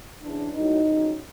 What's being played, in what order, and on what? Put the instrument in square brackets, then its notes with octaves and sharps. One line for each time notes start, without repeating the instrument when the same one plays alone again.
[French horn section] E2 C#3 E3 D4
A2 F#3 D#4
F2 C#3 F#3